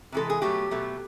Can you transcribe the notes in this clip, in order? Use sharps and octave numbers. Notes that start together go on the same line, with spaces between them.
C3 E3 G#3 A4
G#4
B2 F#3 A3 G4
B2 F#3 A3